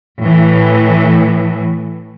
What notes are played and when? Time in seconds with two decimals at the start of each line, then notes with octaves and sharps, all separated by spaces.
0.22 A2 E3